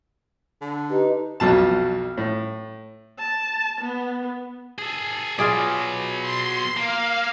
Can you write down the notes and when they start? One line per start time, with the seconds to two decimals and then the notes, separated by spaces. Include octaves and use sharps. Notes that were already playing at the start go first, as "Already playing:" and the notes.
0.61 D3
0.90 D#4 G4 B4
1.40 B1 F2 B2 A5
2.17 A2
3.18 A5
3.81 B3
4.78 G#4 A4
5.39 B2 F#3 F4 G#4 D5
6.20 C6
6.77 A#3 F5